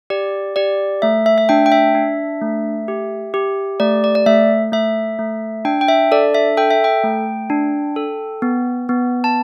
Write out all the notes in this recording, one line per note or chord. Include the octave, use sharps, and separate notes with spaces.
G4 D5
G4 D5
A3 E5
E5
E5
D4 G5
G5
E5
D4
A3
G4
G4
A3 D5
D5
D5
A3 E5
A3 E5
A3
D4 G5
G5
E5
A4 D5
E5
A4 G5
E5
G5
A3
D4
A4
B3
B3
A5